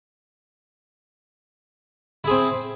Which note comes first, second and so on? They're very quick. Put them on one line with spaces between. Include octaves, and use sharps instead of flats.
E4 G#4 C4